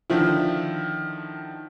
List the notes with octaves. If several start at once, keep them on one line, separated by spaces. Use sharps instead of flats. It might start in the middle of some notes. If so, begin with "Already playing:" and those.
D3 D#3 F3 E4